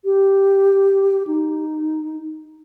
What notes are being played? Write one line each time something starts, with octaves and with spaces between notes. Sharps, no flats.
G4
D#4